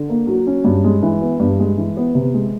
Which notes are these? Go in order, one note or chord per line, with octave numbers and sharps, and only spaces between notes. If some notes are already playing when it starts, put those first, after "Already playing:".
Already playing: D3
A#3
F#3
C#4
G2
G#3
E3
B3
G2
G#3
E3
B3
C3
G#3